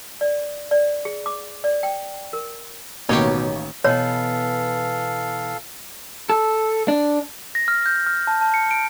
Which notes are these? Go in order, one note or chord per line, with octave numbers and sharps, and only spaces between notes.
D5
D5
G#4
D6
D5
G5
A#4
A1 B2 D#3 A#3 D#4 G4 C#5
B2 E3 A4 C#5 F5
A4
D4
A#6
F6
G6
F6
A5
A5
C#7
D7